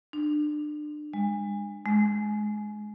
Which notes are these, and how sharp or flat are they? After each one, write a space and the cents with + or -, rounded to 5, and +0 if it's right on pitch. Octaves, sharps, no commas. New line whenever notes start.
D4 +30
G#3 -30
G#3 +20